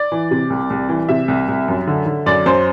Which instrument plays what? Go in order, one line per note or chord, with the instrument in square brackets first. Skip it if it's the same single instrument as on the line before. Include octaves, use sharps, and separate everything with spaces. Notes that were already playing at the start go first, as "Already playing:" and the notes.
Already playing: [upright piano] D5
E3
C3
C2
C2
E3
C3 E5
C2
C2
F#2
D3
D3
F#2 D5
F#2 C5